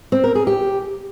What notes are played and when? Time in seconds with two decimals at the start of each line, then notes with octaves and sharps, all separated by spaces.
0.12 C4
0.24 A#4
0.35 G#4
0.47 G4